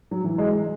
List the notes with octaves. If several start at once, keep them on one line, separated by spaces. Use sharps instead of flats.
F#3
E3
G#3